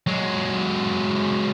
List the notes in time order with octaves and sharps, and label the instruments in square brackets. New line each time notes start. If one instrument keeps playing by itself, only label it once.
[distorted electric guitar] F#3 G#3